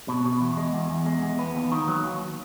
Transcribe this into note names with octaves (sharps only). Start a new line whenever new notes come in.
B2
B2
E2
G#3
E2
E2
G#3
E2
B3
D#2
D#3
F#3
D#2